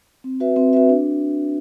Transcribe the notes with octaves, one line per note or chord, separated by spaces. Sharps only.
C4
F#4 B4 E5
C4
F#4 B4 E5
D4